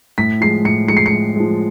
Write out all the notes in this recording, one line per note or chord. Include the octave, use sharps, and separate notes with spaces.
A2 B6
F3 G#3 C7
A2 C#7
F3 G#3 C#7
C7
C#7
A2
F3 G#3